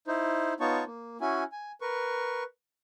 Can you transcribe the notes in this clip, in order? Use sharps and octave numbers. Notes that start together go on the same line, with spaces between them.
D#4 E4 C5
B3 D#4 F4 C#5 A5 C#6
A#3
C#4 E4 F#4 G#5
G#5
A#4 B4 C#6